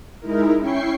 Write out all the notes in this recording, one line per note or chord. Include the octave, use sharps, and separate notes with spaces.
G#3 D#4 E4 A#4
C#4 E4 G5 C#6 C7